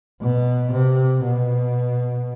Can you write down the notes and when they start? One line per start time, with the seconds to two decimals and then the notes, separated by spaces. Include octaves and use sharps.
0.21 B2
0.72 C3
1.24 B2